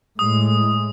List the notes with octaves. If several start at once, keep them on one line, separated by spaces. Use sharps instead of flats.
A2 G#3 D#6